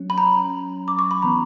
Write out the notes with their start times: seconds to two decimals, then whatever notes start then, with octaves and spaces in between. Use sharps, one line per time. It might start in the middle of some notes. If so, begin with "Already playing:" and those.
Already playing: F#3 C#4
0.10 B5
0.18 A#5
0.88 D6
0.99 C#6
1.11 B5
1.22 E3 B3 A#5